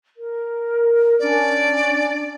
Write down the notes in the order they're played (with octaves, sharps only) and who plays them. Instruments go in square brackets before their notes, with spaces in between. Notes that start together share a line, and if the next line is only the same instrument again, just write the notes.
[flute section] A#4
[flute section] C#4 D4 [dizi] D5